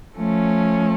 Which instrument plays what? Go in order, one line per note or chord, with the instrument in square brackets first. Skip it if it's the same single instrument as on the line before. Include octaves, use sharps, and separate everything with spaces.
[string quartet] F3 A3 C#4